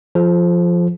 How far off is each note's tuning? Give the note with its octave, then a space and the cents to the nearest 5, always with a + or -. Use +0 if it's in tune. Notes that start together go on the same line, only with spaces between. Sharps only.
F3 +0 A4 -40